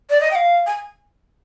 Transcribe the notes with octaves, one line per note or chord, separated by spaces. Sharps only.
D5
D#5
G5
F5
G#5